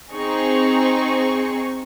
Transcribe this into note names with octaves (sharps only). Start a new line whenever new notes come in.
C4 D#4 G#4 C#6